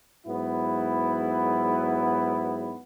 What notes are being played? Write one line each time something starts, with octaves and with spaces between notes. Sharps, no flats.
G#2 F#3 B3 E4